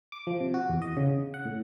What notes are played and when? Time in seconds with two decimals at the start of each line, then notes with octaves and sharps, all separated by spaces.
0.12 D6
0.27 F3
0.40 C3
0.54 F#4
0.69 E2
0.82 D#5
0.97 C#3
1.34 F#5
1.45 A2